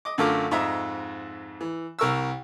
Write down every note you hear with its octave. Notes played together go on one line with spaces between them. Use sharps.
D#5 D6
F#2 D3 A3 F4 A#4 D6
F2 G#2 D#5 E5 A#5
E3
C2 A#4 C#6 E6